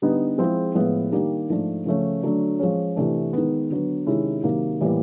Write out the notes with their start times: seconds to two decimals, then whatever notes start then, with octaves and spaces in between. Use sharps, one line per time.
0.02 D3 G3 B3 D#4
0.38 F3 G#3 C4 E4 G#4
0.75 A2 F3 G#3 B3 E4
1.12 D#3 G3 A#3 D4 G4
1.49 G#2 F3 A3 D4
1.85 C#3 F3 A3 C#4
2.23 D3 F#3 A3 D4
2.60 F3 G#3 C#4
2.96 C3 E3 A3 D4
3.33 D#3 G#3 B3
3.70 D3 F#3 B3
4.06 C3 D#3 G#3 C#4 E4
4.43 C3 D#3 F#3 A#3
4.81 A2 E3 G3 A#3